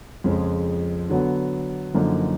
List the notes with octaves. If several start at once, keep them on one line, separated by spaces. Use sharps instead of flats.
F2 C#3 F3 G#3
D3 F#3 B3
F#2 D3 F3 A#3 D#4